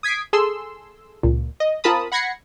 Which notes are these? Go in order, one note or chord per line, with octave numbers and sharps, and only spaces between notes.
D#6 G#6 B6 C7 D7
G#4 A4 C6 E6
C#2 A#2
D#5
C4 F4 A#4 A5 B5 D#6
F#5 B5 G#6 A#6 C7 C#7